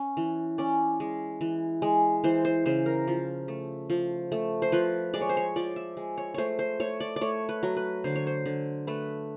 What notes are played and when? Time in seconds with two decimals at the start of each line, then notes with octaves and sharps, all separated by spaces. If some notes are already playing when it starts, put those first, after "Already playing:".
Already playing: C#4
0.17 E3
0.58 C#4 D5
1.00 G#3
1.41 E3
1.82 G#3
2.24 E3 C5
2.45 C5
2.66 C#3 C5
2.86 A#4
3.08 F3
3.48 A3
3.90 F3
4.32 A3
4.62 C5
4.72 F3 B4
5.14 G#3 D5
5.21 C#5
5.29 C5
5.37 C#5
5.56 F3 D5
5.76 E5
5.97 G#3
6.18 C#5
6.34 A3 C5 C#5
6.59 C5
6.80 A3 C#5
7.00 D5
7.16 D5
7.21 A3 C#5
7.49 B4
7.63 F#3
7.77 B4
8.04 D3 C5
8.16 C#5
8.27 C5
8.46 D3
8.87 A3 B4